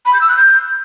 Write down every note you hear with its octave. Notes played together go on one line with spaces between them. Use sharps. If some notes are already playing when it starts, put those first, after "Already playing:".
B5
G6
E6
F#6
G6